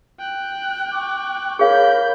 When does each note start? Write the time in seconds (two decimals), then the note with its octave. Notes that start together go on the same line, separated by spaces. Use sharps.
0.19 G5 F#6
0.92 C#6 D6
1.59 G#4 A#4 C#5 F5 B5 G6